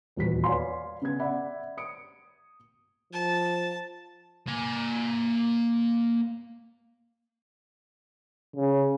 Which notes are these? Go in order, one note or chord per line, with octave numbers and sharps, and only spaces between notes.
D#1 E2 F#4 B4 B6
B4 C#5 D5 F5 G#5 C6
C#3 B3 G#6
D5 E5 F#5 B5
D#6 C#7 D7
F3 A5
A#3 G#5
C#3